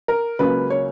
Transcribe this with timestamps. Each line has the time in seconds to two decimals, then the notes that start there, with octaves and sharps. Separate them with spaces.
0.08 A#4
0.39 C#2 C#3 F#3 A#3 B4
0.70 C#5